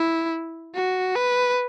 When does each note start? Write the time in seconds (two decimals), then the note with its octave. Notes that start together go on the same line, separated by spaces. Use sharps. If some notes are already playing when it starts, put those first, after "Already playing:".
Already playing: E4
0.75 F#4
1.16 B4